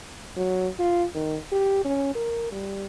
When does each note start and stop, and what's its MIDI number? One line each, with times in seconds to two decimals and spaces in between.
0.36 0.68 54
0.79 1.04 65
1.15 1.38 51
1.52 1.82 67
1.85 2.11 61
2.15 2.49 70
2.52 2.86 55